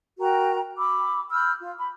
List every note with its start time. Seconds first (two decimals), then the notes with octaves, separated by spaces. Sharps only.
0.20 F#4 A#4 G5 A#5
0.78 B5 D6 E6
1.31 B5 E6 F6 G6
1.59 F4
1.76 B5